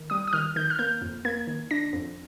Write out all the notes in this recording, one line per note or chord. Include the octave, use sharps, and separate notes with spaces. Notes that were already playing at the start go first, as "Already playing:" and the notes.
Already playing: D#3
G3 D#6
D#6
D#3 F6
D#3 G6
F6
A#3 G6
F2
A#3 G#6
D#3
D4 A#6
F2